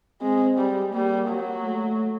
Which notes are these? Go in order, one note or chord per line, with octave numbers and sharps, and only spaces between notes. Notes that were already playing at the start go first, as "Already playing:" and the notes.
G#3 C4
G3
G3 A#3
F#3
A3